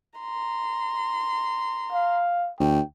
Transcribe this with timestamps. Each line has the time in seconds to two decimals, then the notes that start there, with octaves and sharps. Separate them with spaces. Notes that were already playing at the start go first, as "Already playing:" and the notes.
0.19 A#5 C6
1.92 F5
2.60 D2 G5